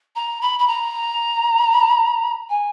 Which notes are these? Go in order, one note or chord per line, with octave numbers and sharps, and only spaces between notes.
A#5
B5
B5
A#5
G#5